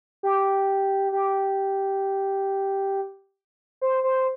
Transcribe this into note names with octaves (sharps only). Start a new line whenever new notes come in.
G4
G4
C5
C5